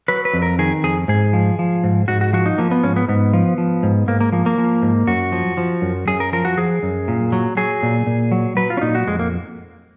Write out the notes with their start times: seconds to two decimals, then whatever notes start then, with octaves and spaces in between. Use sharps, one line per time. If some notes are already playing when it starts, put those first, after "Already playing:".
0.08 F#3 B4
0.25 B4
0.33 F2
0.42 A#4
0.59 D#3 G#4
0.84 F2 G#4
1.08 G#2 G#4
1.33 F3
1.59 F3
1.84 G#2
2.08 G#2 F#4
2.21 F#4
2.33 F3 F#4
2.46 D#4
2.58 F3 A#3
2.71 B3
2.83 G#2 C#4
2.96 B3
3.09 G#2 B3
3.33 F3
3.58 F3
3.83 G#2
4.08 G#2 A#3
4.21 A#3
4.33 F3 A#3
4.46 A#3
4.58 F3
4.82 G#2
5.07 F#2 F#4
5.32 F3
5.57 F3
5.82 F#2
6.08 F#2 G#4
6.20 A#4
6.33 F3 A#4
6.45 F#4
6.57 F3 G#4
6.83 F#2
7.08 A#2
7.32 F#3
7.57 F#3 G#4
7.83 A#2
8.07 A#2
8.32 F#3
8.57 F#3 B4
8.70 F4
8.77 C#4
8.81 A#2 D#4
8.95 F#4
9.07 F2 G#3
9.19 A#3